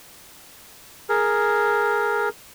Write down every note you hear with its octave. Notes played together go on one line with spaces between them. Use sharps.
G#4 A#4